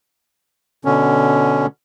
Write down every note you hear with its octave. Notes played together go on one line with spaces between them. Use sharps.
B2 D3 C#4